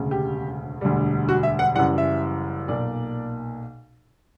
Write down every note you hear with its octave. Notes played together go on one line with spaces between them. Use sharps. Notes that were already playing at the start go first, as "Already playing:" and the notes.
Already playing: E1 D2 C#3
G4
E1 D2 D3 G3
F#4
E5
F#5
F#1 F#2 E3 G3 F#5
E5
B1 A#2 A#3 D5